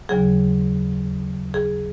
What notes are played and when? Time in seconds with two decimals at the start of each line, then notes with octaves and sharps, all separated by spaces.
0.09 D#2 C#3 F#3 G#4
1.54 G#4